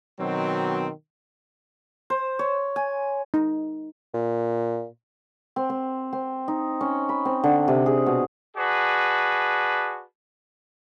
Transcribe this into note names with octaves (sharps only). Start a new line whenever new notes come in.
B2 D#3 F#3 C4
C5
C#5
G#5
D#4
A#2
C4
C4
C4
D#4
C#4
B5
C4
D3
C3
G#4
B2
F#4 G#4 B4 D5 A5